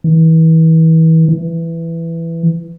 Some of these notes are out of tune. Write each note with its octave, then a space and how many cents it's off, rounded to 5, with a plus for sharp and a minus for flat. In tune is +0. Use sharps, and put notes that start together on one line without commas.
E3 -35
E3 +10